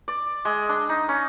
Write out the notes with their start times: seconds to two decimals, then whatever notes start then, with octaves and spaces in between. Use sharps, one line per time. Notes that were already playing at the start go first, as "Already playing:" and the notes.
0.08 D5
0.45 G#3
0.69 D4
0.89 D#4
1.09 C#4